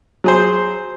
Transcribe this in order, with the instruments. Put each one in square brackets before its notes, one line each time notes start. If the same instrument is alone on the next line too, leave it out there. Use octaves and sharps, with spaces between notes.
[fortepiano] F#3 G#4 C5